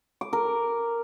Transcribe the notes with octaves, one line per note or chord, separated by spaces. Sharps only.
D6
A#4